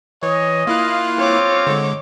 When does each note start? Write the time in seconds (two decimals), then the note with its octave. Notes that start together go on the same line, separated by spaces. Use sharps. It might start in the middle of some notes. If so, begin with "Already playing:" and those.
0.23 E3 C#5 D#5
0.67 A#3 E4 F4 F5 F#6
1.18 C4 C#5 D6
1.67 D3 G#3